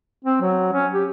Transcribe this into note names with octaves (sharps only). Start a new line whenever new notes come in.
C4
F#3
C#4
G4